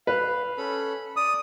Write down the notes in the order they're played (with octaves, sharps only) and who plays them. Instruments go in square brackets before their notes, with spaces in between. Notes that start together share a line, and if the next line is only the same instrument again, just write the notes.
[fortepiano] B4 [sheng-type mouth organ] F5
[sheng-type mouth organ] C#4 A4 B5
[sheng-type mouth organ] D5 [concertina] D#6